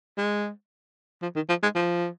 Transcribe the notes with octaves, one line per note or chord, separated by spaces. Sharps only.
G#3
F3
D#3
F3
G#3
F3